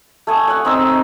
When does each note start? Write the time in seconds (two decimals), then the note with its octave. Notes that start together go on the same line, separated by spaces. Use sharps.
0.27 A3 G#5 D#6
0.48 C#5 F#5
0.65 C4 D#4 E6